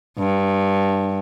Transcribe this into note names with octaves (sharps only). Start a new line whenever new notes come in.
G2